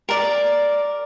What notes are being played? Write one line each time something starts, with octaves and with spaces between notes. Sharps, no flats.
A#4 D5